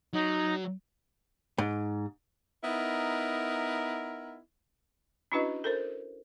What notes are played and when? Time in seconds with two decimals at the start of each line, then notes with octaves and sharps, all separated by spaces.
0.13 F#3 D#4
1.58 G#2
2.64 B3 D#4 E4 A#4
5.32 C#4 D4 E4 F#4 B4 D#5
5.64 A4 A#4 C5